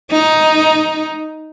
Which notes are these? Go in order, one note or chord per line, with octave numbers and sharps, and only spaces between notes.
D#4